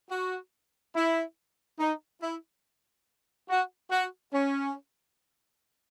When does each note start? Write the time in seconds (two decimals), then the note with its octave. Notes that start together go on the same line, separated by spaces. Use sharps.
0.10 F#4
0.95 E4
1.80 D#4
2.22 E4
3.49 F#4
3.91 F#4
4.33 C#4